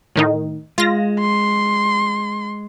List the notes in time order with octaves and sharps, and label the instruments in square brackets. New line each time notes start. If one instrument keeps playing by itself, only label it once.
[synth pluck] A2 D#3 D#4
[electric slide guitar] G#3 [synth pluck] F4 A#6
[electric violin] C6